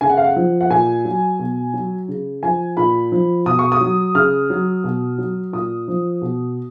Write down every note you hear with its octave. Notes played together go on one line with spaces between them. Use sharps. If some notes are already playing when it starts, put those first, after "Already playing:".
C#3 G#5
F#5
F5
F#5
F3
F#5
A#2 G#5
F#3
B2
F#3
C#3
F3 G#5
A#2 B5
F3
B2 D#6
C#6
D#6
F#3
C#3 F6
F#3
B2
F#3
A#2 D#6
F3
B2